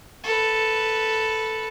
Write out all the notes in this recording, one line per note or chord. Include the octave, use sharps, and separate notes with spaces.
A4 B4